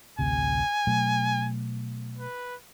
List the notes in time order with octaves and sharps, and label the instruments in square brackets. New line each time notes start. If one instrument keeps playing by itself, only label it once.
[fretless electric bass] A1 D2 C3 [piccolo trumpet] G#5
[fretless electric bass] B2 F#3 A3
[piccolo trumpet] B4